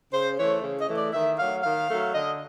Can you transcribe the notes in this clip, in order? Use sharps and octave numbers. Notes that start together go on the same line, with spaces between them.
C#3 C5
E3 A3 C#5
C#3
D#5
E3 A3
D5
D#3 E5
F#3 A3 F5
D#3 F5
F#3 A3
D3 D#5